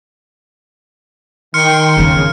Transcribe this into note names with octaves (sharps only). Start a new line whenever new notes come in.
D#3 G5 C6 F6 C#7
C#3 B3 D4